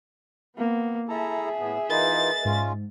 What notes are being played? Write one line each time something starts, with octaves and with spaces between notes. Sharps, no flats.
A#3 B3
E4 G#4 A4 E5 A5 A#5
A2 B3
E3 D#4 F4 A#4 B4 D#5 A6
G#2 G#3 C#4 F4